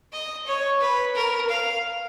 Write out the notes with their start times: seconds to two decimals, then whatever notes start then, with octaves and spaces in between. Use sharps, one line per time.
0.12 D#5
0.46 C#5
0.81 B4
1.15 A#4
1.49 F5